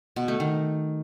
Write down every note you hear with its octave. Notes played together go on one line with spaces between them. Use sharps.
B2
A3
D#3